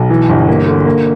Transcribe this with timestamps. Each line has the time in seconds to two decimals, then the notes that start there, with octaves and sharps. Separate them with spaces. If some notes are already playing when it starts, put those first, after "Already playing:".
Already playing: B1
0.10 E3
0.29 G1
0.47 A#3
0.67 D3
0.85 A#3